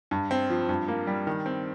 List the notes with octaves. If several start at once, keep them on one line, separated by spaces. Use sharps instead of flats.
G2
C4
F3
G2
A#3
G3
D#3
C4